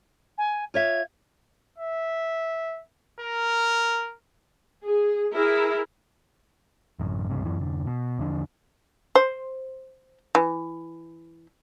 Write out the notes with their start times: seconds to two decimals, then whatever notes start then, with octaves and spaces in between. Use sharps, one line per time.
0.37 G#5
0.74 F4 C#5 E5 G#6
1.78 E5
3.20 A#4
4.84 G#4
5.34 E4 G#4 A#4
7.00 A1 F#2
7.29 C#2 G2 C3
7.45 F#2 E3
7.58 F1 D3
7.87 B2
8.19 E2 D3 F3 D4
9.15 C5
10.35 E3